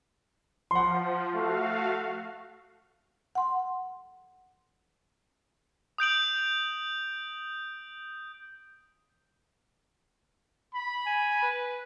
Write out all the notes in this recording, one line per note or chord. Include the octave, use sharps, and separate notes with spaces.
F3 F#5 C6
A3 F#4 F5
F#5 C6
D#6 G6 D7 F#7
B5
G#5
B4